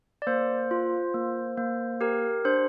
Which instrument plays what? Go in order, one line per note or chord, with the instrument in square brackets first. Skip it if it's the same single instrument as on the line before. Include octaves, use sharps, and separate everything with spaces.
[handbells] D5
A#3 C5
F4
A#3
A#3
G4 A#4
D4 C5